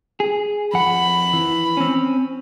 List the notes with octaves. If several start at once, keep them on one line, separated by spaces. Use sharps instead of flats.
G#4
F2 F#5 B5
E3
C4 C#4